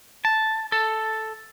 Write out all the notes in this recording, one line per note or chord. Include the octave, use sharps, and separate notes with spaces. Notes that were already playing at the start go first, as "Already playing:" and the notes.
A5
A4